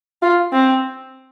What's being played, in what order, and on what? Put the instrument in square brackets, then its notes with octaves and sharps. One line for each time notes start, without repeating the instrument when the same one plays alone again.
[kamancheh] F4
C4